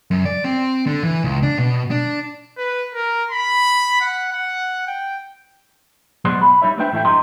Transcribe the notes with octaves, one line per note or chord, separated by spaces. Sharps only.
F#2
D5
C4
D3
E3
C#2
D4
B2
D4
B4
A#4
B5
F#5
F#5
G5
B2 F#3 G#3 F#4 C5 D5
B5
G3 D#4 C#5 E5
A3 D4 B4 C5 E5 G5
A2 E3 F#4 E5 G5
G2 F#3 F#4 D#5 A#5 C6